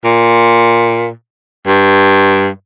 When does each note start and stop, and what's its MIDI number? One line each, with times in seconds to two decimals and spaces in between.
0.04 1.10 46
1.67 2.48 43